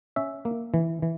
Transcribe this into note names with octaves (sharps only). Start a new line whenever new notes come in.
C#4 E5
A#3
E3
E3